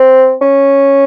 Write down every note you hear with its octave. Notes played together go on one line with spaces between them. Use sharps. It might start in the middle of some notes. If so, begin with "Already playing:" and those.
Already playing: C4
C#4